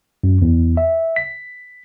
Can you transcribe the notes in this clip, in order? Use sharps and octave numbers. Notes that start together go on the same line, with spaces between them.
F#2
E2
E5
B6